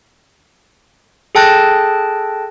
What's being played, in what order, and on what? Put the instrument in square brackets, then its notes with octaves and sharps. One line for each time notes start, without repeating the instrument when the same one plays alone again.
[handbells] G#4 A4 G5 A5 F#6 A#6